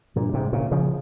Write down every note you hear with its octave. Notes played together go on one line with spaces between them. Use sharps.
G2 A#2
G#2 C3
A#2 C#3
C#3 F3